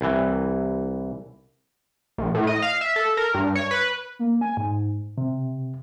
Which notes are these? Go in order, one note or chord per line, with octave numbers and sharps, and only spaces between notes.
C2 E3
A#1
A2
D#5
F5
E5
A4
A#4
G2
C#5
B4
A#3
G#5
G#2
C3